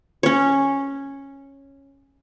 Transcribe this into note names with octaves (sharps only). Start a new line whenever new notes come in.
C#4 C#5